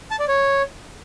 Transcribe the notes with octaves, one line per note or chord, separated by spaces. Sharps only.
A5
D5
C#5